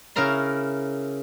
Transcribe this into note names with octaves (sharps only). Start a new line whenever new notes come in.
C#3 E4 A#4 A#5 C6